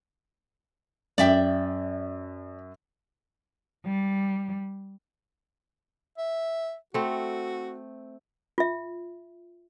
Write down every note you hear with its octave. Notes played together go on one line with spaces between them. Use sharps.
F#2 D5 E5 G5
G3
E5
A3 C4 F#4
F4 E5